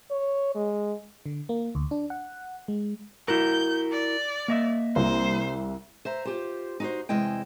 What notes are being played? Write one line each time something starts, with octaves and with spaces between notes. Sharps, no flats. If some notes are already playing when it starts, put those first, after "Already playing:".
C#5
G#3
D3
A#3
D2
D4
F#5
G#3
E4 F#4 A#4 G6
D5
A#3 D#5 E5
C2 C5
C5 E5 A#5
F4 G4 C5
D#4 F#4 C5
E2 C3 G#3 E4 D#5 G5